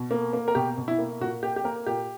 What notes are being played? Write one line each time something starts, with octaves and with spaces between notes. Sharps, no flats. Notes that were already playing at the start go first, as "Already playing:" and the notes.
Already playing: B2
A#3
A#3
A#4
B2 G4
B2
E4
A#3
A#2 F#4
A#3 G4
G4
A#3 A#4
A#2 G4